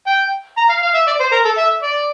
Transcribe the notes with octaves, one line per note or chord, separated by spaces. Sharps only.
G5
A#5
F5
F5
E5
D5
C5
A#4
A4
E5
D5